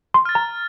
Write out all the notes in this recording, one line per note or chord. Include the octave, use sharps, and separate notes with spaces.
C6
F6 A6
A#5